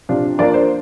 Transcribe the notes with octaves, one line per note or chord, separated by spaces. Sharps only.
C3 F3 D4
F3 A#3 D4 D5
C5